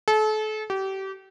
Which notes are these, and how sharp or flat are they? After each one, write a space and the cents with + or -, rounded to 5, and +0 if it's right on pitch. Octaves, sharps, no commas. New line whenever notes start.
A4 -35
G4 -30